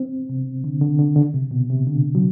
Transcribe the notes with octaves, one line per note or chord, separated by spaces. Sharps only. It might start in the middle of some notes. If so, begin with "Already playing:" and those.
Already playing: C4
C3
D3
D3
D3
D3
C3
B2
C3
D3
F#3